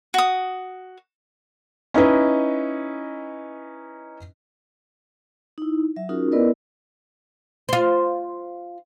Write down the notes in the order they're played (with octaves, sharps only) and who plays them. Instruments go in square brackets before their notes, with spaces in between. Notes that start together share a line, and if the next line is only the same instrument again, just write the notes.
[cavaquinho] F#4 D#6
[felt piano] C#4 D#4 E4 B4 D#5
[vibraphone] D#4 E4
F#3 E5
C#4 D#4 F4 F#4 G#4 A#4
B3 E4 A#4 B4 D5 D#5
[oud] F4 C5